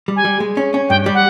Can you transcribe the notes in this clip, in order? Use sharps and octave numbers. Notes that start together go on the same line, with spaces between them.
G3
G#5
G3
G#3
C#4
C#4
G2 G5
G3
F#5